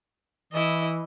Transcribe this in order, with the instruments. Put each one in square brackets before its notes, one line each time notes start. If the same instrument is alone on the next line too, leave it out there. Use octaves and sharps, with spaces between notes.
[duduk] E3 [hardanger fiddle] E4 D#5